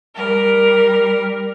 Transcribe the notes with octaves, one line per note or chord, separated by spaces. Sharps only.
G3 A#4